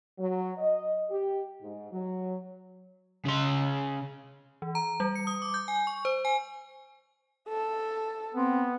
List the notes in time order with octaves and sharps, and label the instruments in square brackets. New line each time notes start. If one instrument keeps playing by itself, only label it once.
[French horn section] F#3
D#5
G4
G#2
F#3
[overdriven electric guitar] C#3 C6
[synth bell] E3
A#5
G3
C#7
D#6
D6
G6
G#5
C#6
C5
G#5
[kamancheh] A4
[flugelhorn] B3 [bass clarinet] C4